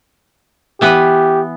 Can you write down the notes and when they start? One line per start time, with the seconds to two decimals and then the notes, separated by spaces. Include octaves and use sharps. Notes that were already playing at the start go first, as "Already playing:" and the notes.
0.81 E3 B3 G4 B4